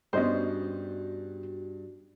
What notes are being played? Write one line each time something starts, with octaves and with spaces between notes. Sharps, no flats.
G2 B3 C#4 F#4 C5 D#5 C6